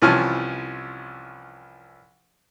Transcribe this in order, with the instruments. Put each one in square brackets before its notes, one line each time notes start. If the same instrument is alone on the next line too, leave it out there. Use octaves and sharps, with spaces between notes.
[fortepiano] C2 E3 F3 C#4 A5 F6